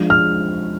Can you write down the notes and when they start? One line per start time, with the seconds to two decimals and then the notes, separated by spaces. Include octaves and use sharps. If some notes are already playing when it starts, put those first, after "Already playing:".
Already playing: F3 G#3 D4 F4
0.10 F6